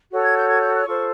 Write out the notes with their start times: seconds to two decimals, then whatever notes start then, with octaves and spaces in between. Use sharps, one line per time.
0.12 F#4 A4 C#5
0.24 G#6
0.36 G6
0.49 G#6
0.61 G6
0.74 F#6
0.86 F4 A4 C5 C#6